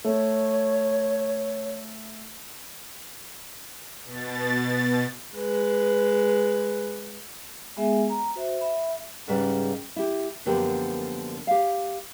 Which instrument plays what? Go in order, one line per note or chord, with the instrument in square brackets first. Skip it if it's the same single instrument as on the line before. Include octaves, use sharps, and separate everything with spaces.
[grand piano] A3 [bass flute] C#5
[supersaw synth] B2 A6
[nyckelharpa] G#3 B4
[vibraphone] G#3 B3 G#4 E5 G#5
A#5
F#4 C5 E5
E5 B5
[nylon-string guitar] D2 G#2 C#3 G3 B4 D5
E4 G4
F#2 D3 F3 A#3 B3 G4
G4 F5